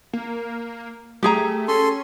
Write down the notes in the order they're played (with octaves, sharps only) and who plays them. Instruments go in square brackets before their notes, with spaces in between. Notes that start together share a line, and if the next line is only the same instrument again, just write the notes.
[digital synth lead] A#3
[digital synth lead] A3 [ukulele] G4 G#4 A#5
[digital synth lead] C#4 [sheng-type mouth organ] A4 C6